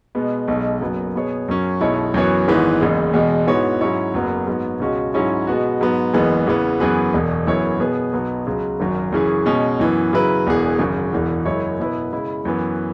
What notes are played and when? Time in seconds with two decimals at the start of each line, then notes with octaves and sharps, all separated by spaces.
0.15 B2 G#3 B3
0.48 B1 B2 G#3
0.81 F#1 F#2 F#3 B3
1.15 B2 B3 G#4 C#5
1.48 F#2 F#3 C#4
1.81 B1 B2 G#3 E4 C#5
2.14 F#2 E3 B3 F#4 C#5
2.48 G#1 G#2 E3 B3
2.80 F#1 E2 C#3 G#3
3.14 E2 B2 G#3
3.47 G#2 E3 B3 F#4 C#5
3.81 G#2 F#3 C#4 E4 C#5
4.14 F#1 F#2 F#3 B3
4.47 G#2 F#3 B3
4.80 C#2 B2 G#3 C#4 F#4
5.14 G#2 F#3 C#4 E4 C#5
5.47 B2 G#3 B3 F#4
5.81 G#2 F#3 B3
6.13 F#1 E2 E3 G#3 B3
6.47 E2 C#3 E3 B3
6.80 F#2 E3 B3 G#4 B4
7.13 E1 E2 B2
7.46 F#2 E3 B3 E4 C#5
7.79 B2 B3 G#4 B4
8.13 B1 B2 F#3 B3
8.47 C#2 C#3 F#3
8.80 G#1 F#2 F#3
9.12 F#2 C#3 E3 C#4 G#4
9.46 B2 G#3 C#4
9.80 F#2 E3 B3
10.13 C#3 F#3 E4 B4
10.47 E1 E2 E3 B3 G#4
10.79 G#1 F#2 C#3
11.13 E1 E2 E3
11.45 F#2 C#3 G#3 E4 C#5
11.79 B2 B3 E4 B4
12.12 C#3 G#3 E4
12.45 F#2 E3 B3